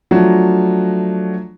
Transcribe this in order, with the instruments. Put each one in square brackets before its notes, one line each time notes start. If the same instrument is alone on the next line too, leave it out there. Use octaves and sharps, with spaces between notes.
[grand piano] F3 F#3 A3 D4 F#4